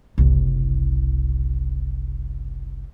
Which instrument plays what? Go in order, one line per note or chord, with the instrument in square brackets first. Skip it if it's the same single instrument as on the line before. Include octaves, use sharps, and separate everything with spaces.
[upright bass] F#1 C2